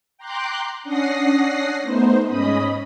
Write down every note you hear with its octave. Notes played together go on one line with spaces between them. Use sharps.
G5 A#5 C6 D6 F#6 G6
C#4 D4 F#5 D#6 A#6 C7
A3 B3 D#4 C5
G#2 C#4 D#5 B5 D#6